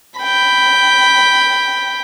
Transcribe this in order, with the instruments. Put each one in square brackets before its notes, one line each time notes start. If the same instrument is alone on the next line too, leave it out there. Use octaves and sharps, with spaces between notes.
[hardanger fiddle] G5 B5